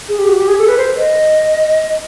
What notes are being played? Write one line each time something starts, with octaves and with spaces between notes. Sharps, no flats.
G#4
G4
F#4
G4
G#4
A4
B4
C5
D#5